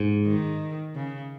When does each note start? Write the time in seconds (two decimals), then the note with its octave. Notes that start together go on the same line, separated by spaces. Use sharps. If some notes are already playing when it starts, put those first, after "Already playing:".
Already playing: G#2
0.26 D#3
0.95 C#3